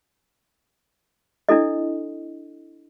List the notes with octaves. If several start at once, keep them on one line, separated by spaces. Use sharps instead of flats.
D4 E4 A4 D#5